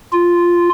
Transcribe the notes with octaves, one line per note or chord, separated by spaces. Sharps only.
F4